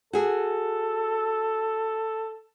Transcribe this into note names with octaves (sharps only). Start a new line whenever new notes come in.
F#4 G#4 A4